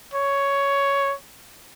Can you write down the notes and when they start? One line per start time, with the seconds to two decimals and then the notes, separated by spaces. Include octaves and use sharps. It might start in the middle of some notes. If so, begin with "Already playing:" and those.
0.14 C#5